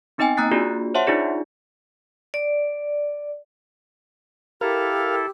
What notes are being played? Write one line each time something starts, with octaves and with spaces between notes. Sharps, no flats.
B3 C4 D#4 D#5 G5 G#5
A#3 A#5 D#6 F#6 A6 C7
A#3 D4 F4 F#4 G#4 D5
C5 C#5 E5 F#5 A5 C6
D4 D#4 F4 G#4 D5
D5
E4 G4 A4 A#4 F5